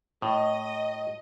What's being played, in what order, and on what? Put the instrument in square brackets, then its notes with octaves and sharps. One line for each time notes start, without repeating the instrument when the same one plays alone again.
[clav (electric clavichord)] A2 [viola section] D#5